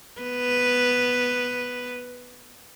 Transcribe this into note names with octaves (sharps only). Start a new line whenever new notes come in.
B3 B4